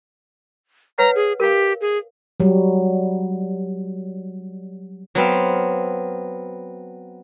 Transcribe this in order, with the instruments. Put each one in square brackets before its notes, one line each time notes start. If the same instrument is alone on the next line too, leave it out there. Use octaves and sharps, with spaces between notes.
[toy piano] B4 C#5 F#5 [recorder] A#5
[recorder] G#4
[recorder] G4 [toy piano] A#4 F5
[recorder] G#4
[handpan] F#3 G3
[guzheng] F#3 B3 C4 F5